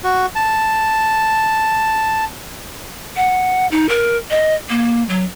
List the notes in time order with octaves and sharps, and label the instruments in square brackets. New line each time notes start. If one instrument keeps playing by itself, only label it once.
[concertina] F#4
A5
[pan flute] F#5
D#4
A#4
D#5
A#3
F#3